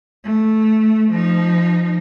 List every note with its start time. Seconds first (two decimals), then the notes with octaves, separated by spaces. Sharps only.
0.24 A3
1.11 F3 D#4